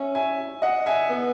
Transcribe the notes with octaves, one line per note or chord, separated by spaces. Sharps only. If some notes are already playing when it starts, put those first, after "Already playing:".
Already playing: C#4 E5 G#5
E5 G#5
D#5 F#5
E5 G#5
B3